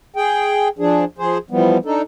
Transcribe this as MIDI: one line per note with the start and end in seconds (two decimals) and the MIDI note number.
0.16 0.68 68
0.16 0.68 79
0.79 1.05 53
0.79 1.05 62
0.79 1.05 68
1.18 1.38 53
1.18 1.38 68
1.18 1.38 72
1.51 1.78 52
1.51 1.78 53
1.51 1.78 55
1.51 1.78 59
1.85 2.02 62
1.85 2.02 63
1.85 2.02 69